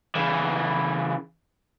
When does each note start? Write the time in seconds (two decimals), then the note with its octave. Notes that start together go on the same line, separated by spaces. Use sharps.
0.15 C#3 E3